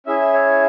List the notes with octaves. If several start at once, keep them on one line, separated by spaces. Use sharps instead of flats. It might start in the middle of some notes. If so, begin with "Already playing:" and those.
C#4 E4 G#4 E5
C#5